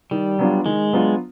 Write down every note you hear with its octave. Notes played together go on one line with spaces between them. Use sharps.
D#3 G3
F#3 B3 D4 F4
D#3 G#3
F#3 B3 D4 F4